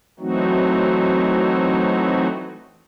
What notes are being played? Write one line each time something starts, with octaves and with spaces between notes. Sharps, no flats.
E3 F#3 A3 C4 D#4 F#4